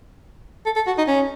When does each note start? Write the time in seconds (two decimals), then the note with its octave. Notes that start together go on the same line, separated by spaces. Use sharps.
0.66 A4
0.76 A4
0.87 F#4
0.98 D#4
1.07 C#4